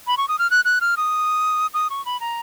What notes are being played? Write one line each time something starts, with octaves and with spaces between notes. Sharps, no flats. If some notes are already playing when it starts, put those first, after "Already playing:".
B5
C#6
D#6
F6
F#6
F#6
F6
D#6
D#6
C#6
B5
A#5